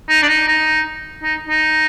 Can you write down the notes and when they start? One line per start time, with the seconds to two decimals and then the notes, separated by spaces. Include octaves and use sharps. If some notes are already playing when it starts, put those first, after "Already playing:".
0.09 D#4
0.22 D4
0.28 D#4
0.47 D#4
1.23 D#4
1.48 D#4